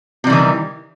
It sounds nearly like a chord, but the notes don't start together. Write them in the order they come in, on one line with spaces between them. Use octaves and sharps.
C3 G3 E3 D#3